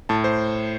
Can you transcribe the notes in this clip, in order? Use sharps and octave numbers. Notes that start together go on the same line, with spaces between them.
A2 A5
C5